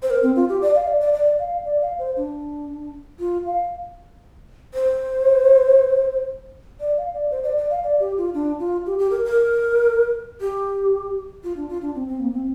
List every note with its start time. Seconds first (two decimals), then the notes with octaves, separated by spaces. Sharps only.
0.03 C5
0.10 A#4
0.23 C4
0.36 F4
0.49 G4
0.62 D5
0.75 F5
0.87 D5
1.01 D5
1.13 D5
1.39 F5
1.65 D5
1.81 F5
1.99 C5
2.17 D4
3.20 F4
3.45 F5
4.74 C5
6.80 D5
6.98 F5
7.14 D5
7.31 C5
7.44 D5
7.57 D5
7.70 F5
7.83 D5
8.00 G4
8.18 F4
8.34 D4
8.59 F4
8.86 G4
8.99 G4
9.11 A#4
9.25 A#4
10.41 G4
11.44 F4
11.56 D4
11.69 F4
11.82 D4
11.95 C4
12.08 C4
12.20 A#3
12.33 C4